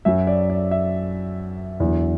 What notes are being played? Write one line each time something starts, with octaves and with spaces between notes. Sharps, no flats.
F#2 F#3 E5
D5
D5
E5
E2 D3 F#3